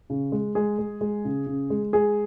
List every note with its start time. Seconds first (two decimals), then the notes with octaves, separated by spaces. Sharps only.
0.10 C#3
0.32 G#3
0.55 G#3 G#4
0.79 G#3
1.01 G#3
1.25 C#3
1.47 C#3
1.70 G#3
1.93 G#3 G#4